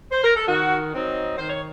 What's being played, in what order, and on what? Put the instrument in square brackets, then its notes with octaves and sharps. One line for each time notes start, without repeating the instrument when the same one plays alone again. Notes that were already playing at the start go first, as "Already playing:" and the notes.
[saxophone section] C5
A#4
A4
D#3 F#4
F#3 C4 D#4
D#3 C5
C#5